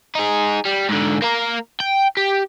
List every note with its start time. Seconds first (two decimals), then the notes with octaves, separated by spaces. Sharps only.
0.15 D#4 G#4
0.65 G3
0.89 G#2 D3
1.22 A#3 A#4
1.80 G5
2.17 G4